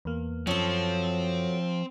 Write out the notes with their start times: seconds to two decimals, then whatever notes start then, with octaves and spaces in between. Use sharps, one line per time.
0.05 E2 A#3
0.47 F#2 F3 F#3 C4 A4